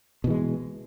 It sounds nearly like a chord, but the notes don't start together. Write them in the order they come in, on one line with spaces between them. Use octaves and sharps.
B2 E3 G#3